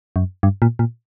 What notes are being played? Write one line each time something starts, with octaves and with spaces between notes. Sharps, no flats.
F#2
G2
A#2
A#2